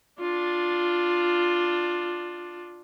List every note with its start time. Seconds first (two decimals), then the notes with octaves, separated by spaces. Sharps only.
0.20 D4 F4